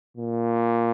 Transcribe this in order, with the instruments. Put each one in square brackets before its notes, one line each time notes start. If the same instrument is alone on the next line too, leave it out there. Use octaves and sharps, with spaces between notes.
[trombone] A#2